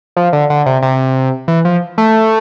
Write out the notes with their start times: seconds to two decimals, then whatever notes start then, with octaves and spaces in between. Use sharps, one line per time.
0.17 F3
0.33 D3
0.50 D3
0.66 C3
0.82 C3
1.48 E3
1.65 F3
1.98 A3